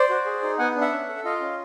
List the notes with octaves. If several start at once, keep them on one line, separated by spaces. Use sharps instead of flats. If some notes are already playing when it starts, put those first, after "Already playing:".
Already playing: C5 D5
F#4
G#4
D#4
B3 F#5 G#5
D4
E5 F#5
C#4
A4
F4 D#5 F5
C#4